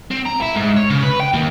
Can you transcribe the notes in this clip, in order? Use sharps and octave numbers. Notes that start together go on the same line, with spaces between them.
C4
A#5
E4
G#2
C#5
C#3
B4
G5
D#2